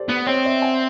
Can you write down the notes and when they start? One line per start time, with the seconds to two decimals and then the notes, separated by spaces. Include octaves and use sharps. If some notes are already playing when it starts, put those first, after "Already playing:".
Already playing: G4 A4 C5 D5
0.09 B3
0.26 C4 C#5 D#5
0.44 D5 E5
0.62 F#5 G#5